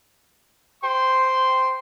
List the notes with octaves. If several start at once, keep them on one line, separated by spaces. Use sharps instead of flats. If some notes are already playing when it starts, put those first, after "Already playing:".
C5 G5 C6